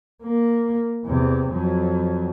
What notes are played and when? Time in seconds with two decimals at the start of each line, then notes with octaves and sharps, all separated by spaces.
0.23 A#3
1.05 E2 C3
1.49 F2 F#3